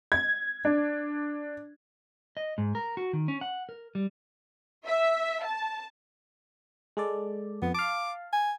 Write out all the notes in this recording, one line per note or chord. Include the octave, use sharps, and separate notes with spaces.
G#6
D4
D#5
G#2
A#4
F#4
D#3
C#4
F#5
A#4
G3
E5
A5
G#3 A4 D5
F2 B3
F5 A5 D6
G#5